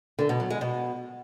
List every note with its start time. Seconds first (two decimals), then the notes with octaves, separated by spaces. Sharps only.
0.19 D3
0.29 B2
0.40 F#3
0.50 G#3
0.61 B2